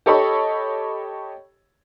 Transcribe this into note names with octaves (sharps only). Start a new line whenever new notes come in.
G4 A4 C#5 D#5 B5